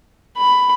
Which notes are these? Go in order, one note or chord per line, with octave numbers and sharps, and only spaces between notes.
B5